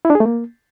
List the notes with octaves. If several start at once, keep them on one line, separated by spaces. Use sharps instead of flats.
E4
D4
G#4
A3
A#3